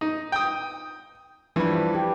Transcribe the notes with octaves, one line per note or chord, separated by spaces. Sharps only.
D#4
G5 D#6
G2 E3 F3 D4 B4
G4